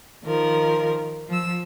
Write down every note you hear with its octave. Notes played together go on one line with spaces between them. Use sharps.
D#3 F3 A#4
F3 E6